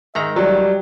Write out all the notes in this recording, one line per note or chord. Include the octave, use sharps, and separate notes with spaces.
G#2 D#3 E5 A#5
F#3 G3